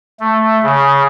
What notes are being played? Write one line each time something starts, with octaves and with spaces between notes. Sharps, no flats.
A3
C#3